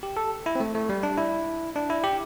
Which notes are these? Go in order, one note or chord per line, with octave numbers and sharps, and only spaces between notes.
G4
A4
E4
C4
A3
A3
G3
D4
E4
D4
E4
G4